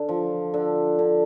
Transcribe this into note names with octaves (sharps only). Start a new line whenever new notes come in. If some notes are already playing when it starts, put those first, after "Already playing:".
Already playing: D3
F3
D3
D3